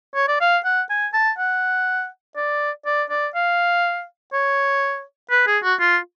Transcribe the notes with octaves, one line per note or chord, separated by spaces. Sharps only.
C#5
D5
F5
F#5
G#5
A5
F#5
D5
D5
D5
F5
C#5
B4
G#4
F#4
F4